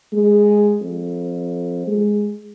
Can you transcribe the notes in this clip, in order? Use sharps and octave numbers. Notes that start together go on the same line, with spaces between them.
G#3
F2
G#3